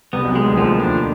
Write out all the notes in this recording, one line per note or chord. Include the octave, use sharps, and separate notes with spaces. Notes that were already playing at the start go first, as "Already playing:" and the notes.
C2 C3 B3
B1 B2
G#3
D2 D3
D#2 D#3 F3
D4